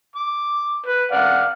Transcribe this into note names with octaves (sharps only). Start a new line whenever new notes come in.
D6
B4
D5 F5 F#5